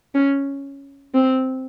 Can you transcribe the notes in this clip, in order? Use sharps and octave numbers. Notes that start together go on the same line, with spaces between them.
C#4
C4